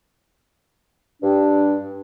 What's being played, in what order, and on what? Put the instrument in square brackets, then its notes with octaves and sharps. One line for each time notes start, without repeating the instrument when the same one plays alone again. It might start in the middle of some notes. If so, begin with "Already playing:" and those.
[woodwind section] G2 D4